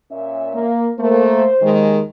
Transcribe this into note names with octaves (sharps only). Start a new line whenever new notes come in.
A#2 C#4 E5
A#3
A3 A#3 C5
D#2 D#3 G#3